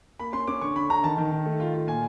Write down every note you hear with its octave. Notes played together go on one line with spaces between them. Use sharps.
A#3 B5
C#4 C6
C#4 D6
D3 C#6
D3 B5
D3 A#5
D#3 A5
D#3
D#3
A3
F4
F4
A#2 G#5